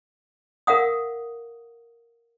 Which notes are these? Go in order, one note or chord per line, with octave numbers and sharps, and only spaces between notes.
A#4 F5 F#5 D#6